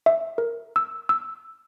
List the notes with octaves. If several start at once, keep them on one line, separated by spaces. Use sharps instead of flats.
E5
A#4
E6
E6